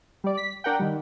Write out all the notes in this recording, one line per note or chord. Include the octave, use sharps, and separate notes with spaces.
G3 D5
B6
D4 A#4 F#5 G5
D#3 G3